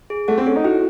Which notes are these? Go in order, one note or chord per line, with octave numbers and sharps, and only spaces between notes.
G#4
A3 F#5
C4
C#4 A4
D#4
E4 F#4